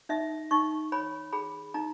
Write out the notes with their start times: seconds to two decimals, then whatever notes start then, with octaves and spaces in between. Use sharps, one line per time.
0.09 D#4 E5
0.51 D#4 C#6
0.92 C#5 B5
1.33 G#4 B5
1.74 D#4 A#5